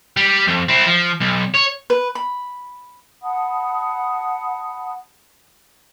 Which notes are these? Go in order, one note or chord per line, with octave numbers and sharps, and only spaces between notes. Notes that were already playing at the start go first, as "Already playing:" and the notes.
G3
F2
C4 E4
F3
B1
C#5
B4
B5
F#5 A5 B5 D#6